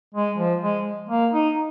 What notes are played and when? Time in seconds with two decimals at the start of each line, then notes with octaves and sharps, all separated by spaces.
0.14 G#3
0.38 F3
0.62 G#3
1.09 A#3
1.33 D#4